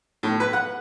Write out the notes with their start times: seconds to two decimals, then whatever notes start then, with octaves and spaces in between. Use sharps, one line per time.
0.23 A2
0.40 B4
0.53 F#5